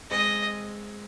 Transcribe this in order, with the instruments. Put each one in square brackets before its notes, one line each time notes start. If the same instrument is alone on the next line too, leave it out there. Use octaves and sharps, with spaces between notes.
[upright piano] G#3 C4 [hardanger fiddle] D#5